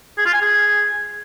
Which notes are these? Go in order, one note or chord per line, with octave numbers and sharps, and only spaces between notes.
G#4
F4
G#5
G#4